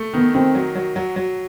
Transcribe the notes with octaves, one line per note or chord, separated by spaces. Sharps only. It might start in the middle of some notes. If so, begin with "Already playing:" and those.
Already playing: A3
D#3 B3
D#3 C4
F#3
F#3
F#3
F#3